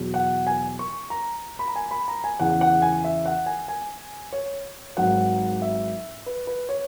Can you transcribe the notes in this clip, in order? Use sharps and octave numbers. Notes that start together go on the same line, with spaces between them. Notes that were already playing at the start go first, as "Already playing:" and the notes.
Already playing: E2 B2 F#3
F#5
G#5
C#6
A#5
B5
A#5
G#5
B5
A#5
G#5
E2 C#3 E3 F#5
F#5
G#5
E5
F#5
G#5
G#5
C#5
G#1 G#2 F#3 F#5
E5
B4
B4
C#5